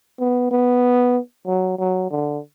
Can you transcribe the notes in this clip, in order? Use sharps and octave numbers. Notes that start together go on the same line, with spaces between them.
B3
B3
F#3
F#3
D3